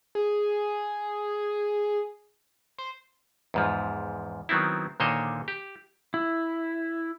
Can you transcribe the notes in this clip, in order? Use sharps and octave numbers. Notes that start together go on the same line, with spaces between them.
G#4
C5
E2 G#2 F3
D#3 F#3 B3 C4 E4
A#2 D3 D#3 C5 C#5 D#5
G4
E4